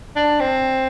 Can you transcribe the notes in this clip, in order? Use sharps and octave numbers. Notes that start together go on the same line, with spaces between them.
D4
C4